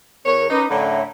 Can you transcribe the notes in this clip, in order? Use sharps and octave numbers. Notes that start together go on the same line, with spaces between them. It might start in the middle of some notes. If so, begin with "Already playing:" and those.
E2 A#4 C#5
C#4 D#4 B4 D6
F#2 A2 D3 C#5 E5 A#5